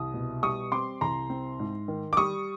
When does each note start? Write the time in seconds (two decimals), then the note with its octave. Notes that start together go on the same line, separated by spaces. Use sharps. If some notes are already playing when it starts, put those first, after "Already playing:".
Already playing: C2 D#6
0.14 B2
0.43 G3 C#6 D#6
0.72 C4 C6 D6
1.01 C2 A#5 C6
1.30 C4
1.60 G#2
1.88 D#3
2.13 D6
2.17 G3 C#6 D#6